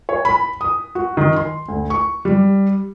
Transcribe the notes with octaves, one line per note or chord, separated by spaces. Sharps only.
C#5
B5
D#6
F#4
D#3
C6
D2
C#6
G3